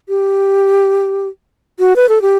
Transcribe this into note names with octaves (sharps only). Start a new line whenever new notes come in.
G4
F#4
B4
A4
G4